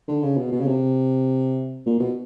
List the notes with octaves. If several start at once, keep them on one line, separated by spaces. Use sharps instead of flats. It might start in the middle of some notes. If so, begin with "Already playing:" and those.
D3
C#3
B2
B2
C#3
C3
A#2
B2